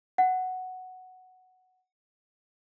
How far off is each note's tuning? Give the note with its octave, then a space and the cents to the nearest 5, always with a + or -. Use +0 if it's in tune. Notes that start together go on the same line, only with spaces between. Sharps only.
F#5 +0